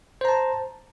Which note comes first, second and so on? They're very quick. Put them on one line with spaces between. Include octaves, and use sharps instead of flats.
C5 A#5 A5